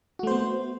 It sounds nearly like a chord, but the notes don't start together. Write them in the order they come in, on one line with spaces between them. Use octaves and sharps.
F#4 A3 C5 B3